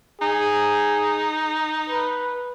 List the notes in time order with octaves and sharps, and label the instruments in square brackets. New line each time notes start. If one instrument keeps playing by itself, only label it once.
[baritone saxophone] D#4 [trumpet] G#4
[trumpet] B4